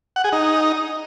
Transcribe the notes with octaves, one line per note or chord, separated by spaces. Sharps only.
F#5
G#4
D#4